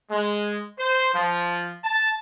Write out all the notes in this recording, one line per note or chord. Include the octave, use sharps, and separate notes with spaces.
G#3
C5
F3
A5